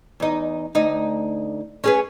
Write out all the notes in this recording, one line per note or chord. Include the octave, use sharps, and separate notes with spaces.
E2 D#4
D2 D#4
C#4 G#4 B4